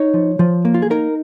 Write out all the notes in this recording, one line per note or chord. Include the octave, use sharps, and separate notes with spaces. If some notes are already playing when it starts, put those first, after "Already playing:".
Already playing: D#4 C#5
F3
F3
A#3
F4
G#4
D#4 A#4